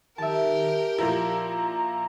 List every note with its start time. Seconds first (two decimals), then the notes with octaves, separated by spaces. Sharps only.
0.18 D#3 G4 A#4 E5 A5
0.98 A#2 F3 E4 A#5